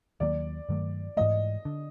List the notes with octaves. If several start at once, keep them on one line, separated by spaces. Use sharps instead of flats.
D#2 D#3 F#3 A#3 D5
G2 D#3 F#3 A3
G#2 E3 A3 D#5
D3